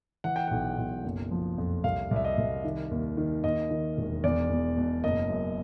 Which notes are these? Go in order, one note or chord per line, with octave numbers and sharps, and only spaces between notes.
E3 F#5
G5
B1 F#5
B1
F#1
F3
F2
C2 F5
C2
E5
D#5
C2
D#3
D#2
D#3
D#2 D#5
D#3
E1
E2 D5
E2
B2
F#1 D#5
F#2